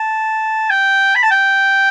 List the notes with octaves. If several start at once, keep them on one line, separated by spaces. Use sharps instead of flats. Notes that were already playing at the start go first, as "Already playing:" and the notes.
Already playing: A5
G5
B5
A5
G5